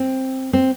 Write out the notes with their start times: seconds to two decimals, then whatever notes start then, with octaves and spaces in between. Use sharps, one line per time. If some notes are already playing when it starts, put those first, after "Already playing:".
Already playing: C4
0.53 C4